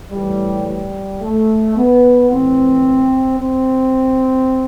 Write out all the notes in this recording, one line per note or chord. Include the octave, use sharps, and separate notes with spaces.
A2 E3 G3
G3
A3
B3
A2 E3 C4
C4